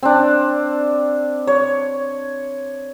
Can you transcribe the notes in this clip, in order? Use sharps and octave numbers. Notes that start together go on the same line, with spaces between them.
C4 D4
C#5